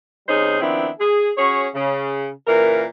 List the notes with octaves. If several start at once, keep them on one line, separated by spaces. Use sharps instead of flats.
C3 G3 C#4 D#4 G#4 C5
D#3 F3 B3 C4 D4 E4
G#4
C#4 F#4 G#4 C#5
C#3
A#2 C#3 E3 A#4